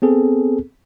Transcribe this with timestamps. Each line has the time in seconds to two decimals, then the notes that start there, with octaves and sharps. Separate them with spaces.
0.02 B3 C4 G#4 A4